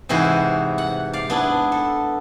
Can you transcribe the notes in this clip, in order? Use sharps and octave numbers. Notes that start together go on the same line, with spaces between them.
G#2 C3 E3 E4 F#4 G#4
F#5
D5 F5
B3 D4 E4 G#4
A4